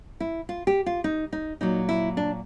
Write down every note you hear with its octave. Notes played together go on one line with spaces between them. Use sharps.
E4
F4
G4
F4
D#4
D#4
A#2 F#3 D#4
E4
D4